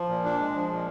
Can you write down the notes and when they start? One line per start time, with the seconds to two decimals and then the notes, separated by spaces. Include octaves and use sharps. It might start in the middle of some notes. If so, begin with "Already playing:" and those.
Already playing: F3
0.09 A#2
0.24 D4
0.39 G#3
0.54 F3
0.70 A#2